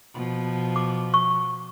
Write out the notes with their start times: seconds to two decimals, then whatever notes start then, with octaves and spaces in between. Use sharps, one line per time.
0.15 B2 F3
0.76 D6
1.14 C#6